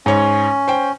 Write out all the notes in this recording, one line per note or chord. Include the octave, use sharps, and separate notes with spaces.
G#2 C#4 C#5
C5 G5